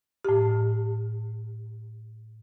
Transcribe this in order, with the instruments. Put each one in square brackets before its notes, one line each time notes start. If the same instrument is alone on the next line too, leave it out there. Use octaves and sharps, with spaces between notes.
[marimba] A2 G4